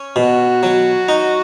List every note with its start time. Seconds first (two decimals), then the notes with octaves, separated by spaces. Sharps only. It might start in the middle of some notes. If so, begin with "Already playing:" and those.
Already playing: C#4
0.16 B2 F#4
0.63 F#3
1.09 D#4